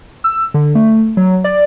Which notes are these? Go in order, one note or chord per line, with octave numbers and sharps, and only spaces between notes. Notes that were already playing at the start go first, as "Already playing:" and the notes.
E6
D3
A3
F#3
D5